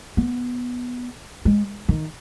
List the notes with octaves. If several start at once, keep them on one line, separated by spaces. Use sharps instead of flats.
B3
G#3
D#3